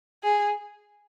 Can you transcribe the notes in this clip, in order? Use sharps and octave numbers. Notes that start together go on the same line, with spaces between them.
G#4